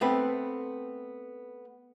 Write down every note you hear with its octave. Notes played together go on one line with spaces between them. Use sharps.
A3 B3 C4 B4